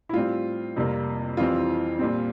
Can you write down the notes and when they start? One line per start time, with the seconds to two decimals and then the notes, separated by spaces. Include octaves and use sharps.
0.09 E4
0.13 A2 G3 C4 F4
0.76 F2 C3 G3 A#3
1.37 F2 E3 G3 C4 F4
1.99 A#2 G3 C4